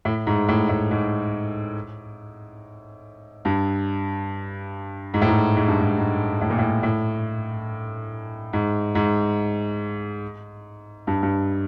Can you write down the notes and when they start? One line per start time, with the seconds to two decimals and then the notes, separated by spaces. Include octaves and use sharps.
0.05 A2
0.27 G#2
0.48 A2
0.69 A2
0.91 G#2
3.45 G2
5.14 G#2
5.21 A2
5.28 G#2
5.57 G#2
5.68 G2
5.79 G#2
5.98 G#2
6.41 A2
6.50 A#2
6.58 A2
6.83 A2
8.53 G#2
8.95 G#2
11.07 G2
11.23 G2